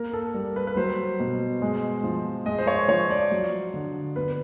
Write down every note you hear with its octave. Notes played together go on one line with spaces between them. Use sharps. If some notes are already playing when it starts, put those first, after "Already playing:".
Already playing: A#3 A#4
A4
G3 A#4
B4
B4
F#3 C5
B2
G#3
F3
G#3 D#5
C5
C#5
F3 C#5
D5
F#3
D3
B3 B4